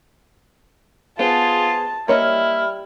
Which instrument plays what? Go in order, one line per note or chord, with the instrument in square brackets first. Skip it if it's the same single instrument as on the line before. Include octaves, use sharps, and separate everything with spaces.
[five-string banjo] B3 C5 [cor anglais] F4 [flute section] G#4 [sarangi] A5
[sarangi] G3 [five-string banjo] A#3 C#5 D#5 [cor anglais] E4 [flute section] F6